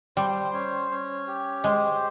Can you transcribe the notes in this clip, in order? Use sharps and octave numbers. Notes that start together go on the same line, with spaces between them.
G3 C5
C#4
C#4
G4
G#3 C5